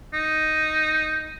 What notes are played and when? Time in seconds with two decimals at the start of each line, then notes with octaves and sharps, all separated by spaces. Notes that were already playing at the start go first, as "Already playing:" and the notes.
0.13 D#4